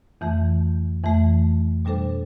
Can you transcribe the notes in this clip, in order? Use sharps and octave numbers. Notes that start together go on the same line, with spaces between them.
F2 E3 A3
F2 E3 A3
B2 G3 D4 A4 C5